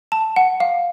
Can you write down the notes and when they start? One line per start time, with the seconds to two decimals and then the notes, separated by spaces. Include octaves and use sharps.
0.12 A5
0.36 F#5
0.60 F5